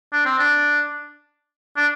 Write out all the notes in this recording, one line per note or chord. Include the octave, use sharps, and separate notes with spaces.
D4
C4
D4
D4